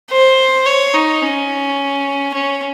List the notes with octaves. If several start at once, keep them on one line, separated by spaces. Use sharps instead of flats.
C5
C#5
D#4
C#4
C#4